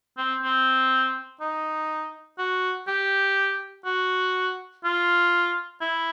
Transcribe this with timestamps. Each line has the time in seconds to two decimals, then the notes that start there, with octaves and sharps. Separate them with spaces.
0.18 C4
0.43 C4
1.41 D#4
2.39 F#4
2.88 G4
3.85 F#4
4.85 F4
5.82 E4